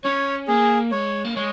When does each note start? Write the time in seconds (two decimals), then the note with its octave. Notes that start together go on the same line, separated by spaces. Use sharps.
0.04 C#4 C#5
0.48 A#3 G#4
0.92 G#3 C#5
1.25 A#3
1.36 G#3 C#5